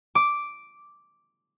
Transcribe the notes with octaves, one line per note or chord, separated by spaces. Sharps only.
D6